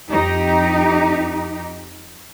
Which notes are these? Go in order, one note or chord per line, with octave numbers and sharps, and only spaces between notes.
F2 D#4 G4